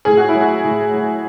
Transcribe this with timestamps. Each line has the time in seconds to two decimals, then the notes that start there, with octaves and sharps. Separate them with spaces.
0.05 A2 G#4
0.17 F#4
0.29 E4
0.35 F#3
0.41 F#4
0.64 A2
0.94 F#3